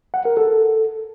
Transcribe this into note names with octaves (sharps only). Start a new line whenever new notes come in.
F#5
A#4
A4